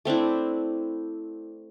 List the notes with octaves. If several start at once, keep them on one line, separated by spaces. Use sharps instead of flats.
A3 C4 D4 E4